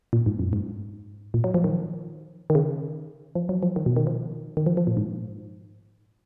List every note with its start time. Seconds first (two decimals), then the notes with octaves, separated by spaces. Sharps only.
0.13 A#2
0.26 G#2
0.39 F#2
0.53 G#2
1.34 A#2
1.44 F#3
1.54 F3
1.64 D#3
2.50 D#3
2.55 C#3
3.35 F3
3.49 F#3
3.63 F3
3.76 D#3
3.86 B2
3.96 D#3
4.07 F3
4.57 D#3
4.66 F3
4.77 F3
4.87 A#2
4.97 G#2